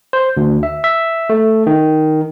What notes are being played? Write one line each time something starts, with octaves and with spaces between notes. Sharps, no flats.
C5
D2
E5
E5
A3
D#3